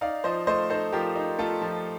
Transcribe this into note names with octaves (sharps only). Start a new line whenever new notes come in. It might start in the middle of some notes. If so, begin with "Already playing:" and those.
D#4 D5 F5
F3 C5 D#5
A3 C5 D#5
D#4 A4 C5
F3 G4 A#4
D#4
A3 F4 A4
F3